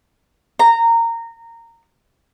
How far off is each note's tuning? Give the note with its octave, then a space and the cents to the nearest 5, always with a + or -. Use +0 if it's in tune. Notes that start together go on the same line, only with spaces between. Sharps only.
A#5 -15